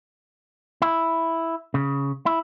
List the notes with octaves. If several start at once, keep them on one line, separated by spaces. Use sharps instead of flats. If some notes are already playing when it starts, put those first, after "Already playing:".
E4
C#3
E4